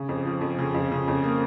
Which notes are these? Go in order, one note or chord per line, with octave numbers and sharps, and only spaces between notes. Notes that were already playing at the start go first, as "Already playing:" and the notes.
Already playing: C#3
F2
F3
F2
C#3
F2
C#3
F2
A#3